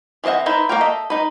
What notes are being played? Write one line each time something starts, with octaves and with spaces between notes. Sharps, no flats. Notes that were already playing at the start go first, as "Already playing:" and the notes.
E3 C4 D#5 E5 F#5
D#4 E4 B4 C5
A#3 F#4 A#4 G5
A4 D#5 E5
D#4 B4